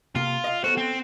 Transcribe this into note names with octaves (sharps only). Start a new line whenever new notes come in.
C3 A#3 F4
D#5 F5
B3 F#4 A4 C5
C4